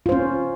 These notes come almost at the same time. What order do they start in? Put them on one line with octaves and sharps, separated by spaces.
F4 C5 C#4